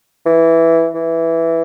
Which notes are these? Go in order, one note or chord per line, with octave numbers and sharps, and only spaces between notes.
E3
E3